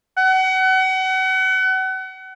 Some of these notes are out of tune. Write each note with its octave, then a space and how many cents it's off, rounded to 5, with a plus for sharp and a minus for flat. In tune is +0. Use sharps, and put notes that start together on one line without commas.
F#5 +30